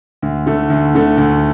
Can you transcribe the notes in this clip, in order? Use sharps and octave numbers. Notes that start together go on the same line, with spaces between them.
D2
D3 A3
D2
D3 A3
D2